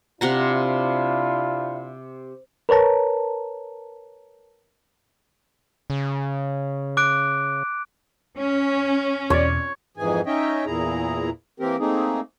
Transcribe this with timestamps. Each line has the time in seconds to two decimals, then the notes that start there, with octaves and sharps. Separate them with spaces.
0.21 C3 D4 E4 F4 F#5 A#5
2.69 A#4 B4 C#5 A5 A#5
5.90 C#3
6.97 D6 F#6 D7
8.37 C#4
9.30 E2 B2 C#5 D5
9.97 F2 G#2 E3 G#4 G#5
10.26 C#4 D#4 C#5 D#5 E5 G5
10.66 E2 A#2 E4 G#4 A#5
11.60 E3 A#3 C4 G4 A#4
11.80 A3 A#3 C4 D#4 G#4